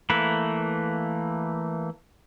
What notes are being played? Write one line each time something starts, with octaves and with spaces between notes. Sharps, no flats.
E3 A3 A#3 B4